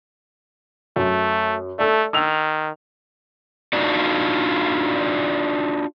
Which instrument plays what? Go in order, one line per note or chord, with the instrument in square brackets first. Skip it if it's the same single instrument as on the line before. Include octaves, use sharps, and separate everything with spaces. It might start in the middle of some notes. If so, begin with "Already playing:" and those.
[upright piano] F#2 [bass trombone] A3
[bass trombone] A3 [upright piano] A4 D5
[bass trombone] D#3 [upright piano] E6 F7
[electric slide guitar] D4 D#4 F4 F#4 D5